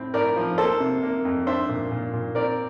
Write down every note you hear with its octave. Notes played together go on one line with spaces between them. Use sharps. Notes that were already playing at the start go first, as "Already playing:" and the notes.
Already playing: A2 C4
A2 A#4 D5
F3
A#3 A4 C5
C3
A#3
F2
D4 C5 E5
A#2
A#2
A#2
C4 A#4 D5